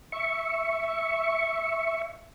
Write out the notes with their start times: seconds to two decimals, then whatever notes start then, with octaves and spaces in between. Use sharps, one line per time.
0.12 E5 C#6